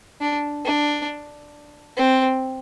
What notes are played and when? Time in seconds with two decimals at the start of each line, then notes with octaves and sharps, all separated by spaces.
0.21 D4
0.65 D4
1.97 C4